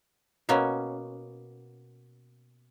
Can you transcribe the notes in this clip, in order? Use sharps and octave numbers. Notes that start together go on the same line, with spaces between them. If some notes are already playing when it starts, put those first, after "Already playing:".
B2 A#3 B3 C#4